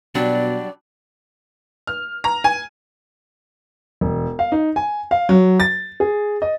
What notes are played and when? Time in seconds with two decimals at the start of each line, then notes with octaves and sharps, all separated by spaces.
0.15 B2 F#3 G3 D4 D5
1.87 F6
2.24 A#5
2.44 G#5
4.01 E1
4.39 F5
4.52 D#4
4.76 G#5
5.11 F5
5.29 F#3
5.60 A6
6.00 G#4
6.42 D#5